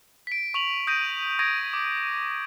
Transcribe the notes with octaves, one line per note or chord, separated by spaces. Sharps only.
B6 D7
C#6 F7 F#7
D#6 G6 A#6 D7 D#7
C#6 D#6 G#6 A#6 D7
D6